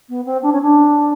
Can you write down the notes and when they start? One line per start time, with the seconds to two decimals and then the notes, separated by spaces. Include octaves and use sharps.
0.08 B3
0.25 C4
0.42 D4
0.52 C#4
0.61 D4